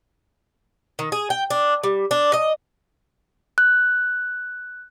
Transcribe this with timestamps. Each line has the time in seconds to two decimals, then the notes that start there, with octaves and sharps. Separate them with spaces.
0.99 D#3
1.12 G#4
1.30 G5
1.50 D4
1.84 G3
2.11 D4
2.33 D#5
3.58 F#6